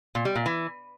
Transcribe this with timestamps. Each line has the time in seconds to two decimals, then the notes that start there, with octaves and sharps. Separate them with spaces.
0.15 A#2
0.25 G3
0.35 A#2
0.46 E3